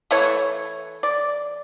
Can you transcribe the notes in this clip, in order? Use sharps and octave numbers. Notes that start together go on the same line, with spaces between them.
E3 A3 C#5
D5